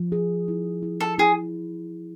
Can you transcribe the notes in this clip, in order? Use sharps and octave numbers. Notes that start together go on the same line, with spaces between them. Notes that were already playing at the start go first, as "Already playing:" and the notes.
Already playing: F3 F4
G#4
E4
E4
A4
E4 G#4